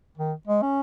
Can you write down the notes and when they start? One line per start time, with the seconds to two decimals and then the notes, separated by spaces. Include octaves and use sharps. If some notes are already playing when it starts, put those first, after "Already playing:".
0.17 D#3
0.47 G#3
0.62 C#4